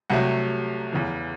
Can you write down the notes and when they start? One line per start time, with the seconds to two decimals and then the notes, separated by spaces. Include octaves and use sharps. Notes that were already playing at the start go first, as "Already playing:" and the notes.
0.10 C2 C3 F#3 A3 F#5
0.93 E2 C#3 E3